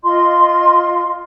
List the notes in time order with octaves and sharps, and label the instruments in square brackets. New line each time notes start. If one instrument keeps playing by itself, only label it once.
[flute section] F4 D#5 C6